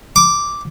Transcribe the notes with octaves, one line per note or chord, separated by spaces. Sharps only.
D6